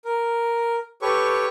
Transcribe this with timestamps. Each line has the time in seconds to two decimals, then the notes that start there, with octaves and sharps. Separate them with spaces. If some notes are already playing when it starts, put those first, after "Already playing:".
0.05 A#4
1.02 G4 A4 B4 C#5 C#6